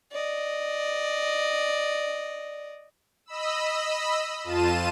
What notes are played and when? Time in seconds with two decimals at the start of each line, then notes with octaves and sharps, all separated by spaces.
0.12 D5 D#5
3.26 D#5 B5 E6
4.44 F2 F4 A5 D#7 E7